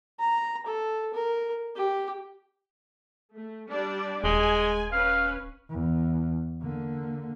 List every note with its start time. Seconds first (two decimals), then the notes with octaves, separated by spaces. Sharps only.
0.20 A#5
0.66 A4
1.14 A#4
1.76 G4
3.36 A3
3.70 G3 D4 D5
4.24 D#1 G#3 G#5
4.92 C#4 B4 F5
5.69 E2
6.62 D3 A#3